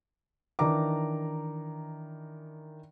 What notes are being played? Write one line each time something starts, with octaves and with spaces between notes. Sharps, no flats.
D#3 E3 D4 A#5 D6